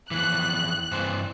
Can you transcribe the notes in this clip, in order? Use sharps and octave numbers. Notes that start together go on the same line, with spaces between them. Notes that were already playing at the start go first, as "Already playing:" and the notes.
F2 G#2 E3 F#6
G2 E3 C4